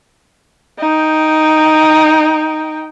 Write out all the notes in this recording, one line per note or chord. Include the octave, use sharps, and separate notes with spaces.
D#4 G5